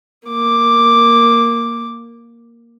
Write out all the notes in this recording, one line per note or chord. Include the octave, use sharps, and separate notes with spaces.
A#3 D6